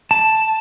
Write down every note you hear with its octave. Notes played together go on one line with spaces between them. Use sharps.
A5